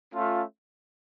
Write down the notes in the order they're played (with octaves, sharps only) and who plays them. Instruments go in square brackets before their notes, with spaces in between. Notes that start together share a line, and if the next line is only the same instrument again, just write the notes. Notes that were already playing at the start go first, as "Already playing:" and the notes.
[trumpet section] A3 C#4 F4